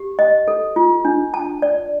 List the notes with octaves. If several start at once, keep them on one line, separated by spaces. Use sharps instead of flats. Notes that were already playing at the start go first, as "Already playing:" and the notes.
Already playing: G4
D#5
A4
F4
D4
A5
D5